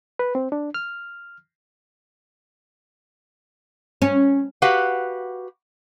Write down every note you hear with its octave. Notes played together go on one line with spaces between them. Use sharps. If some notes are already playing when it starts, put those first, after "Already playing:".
B4
C4
D4
F6
C#4
F#4 G4 B4 F5 F#5